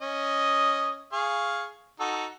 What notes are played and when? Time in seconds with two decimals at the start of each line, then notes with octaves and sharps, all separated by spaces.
0.01 C#4 D#5 D#6
1.13 G#4 F5 C#6
2.00 D#4 F#4 A4